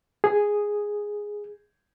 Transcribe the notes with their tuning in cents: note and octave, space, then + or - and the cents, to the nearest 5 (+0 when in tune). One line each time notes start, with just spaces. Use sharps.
G#4 -5